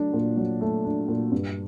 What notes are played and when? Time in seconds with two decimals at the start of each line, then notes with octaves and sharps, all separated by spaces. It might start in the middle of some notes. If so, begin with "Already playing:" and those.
Already playing: F#3 A3 D4
0.13 A#2
0.37 F#3
0.61 A3
0.85 D4
1.08 A#2
1.32 G2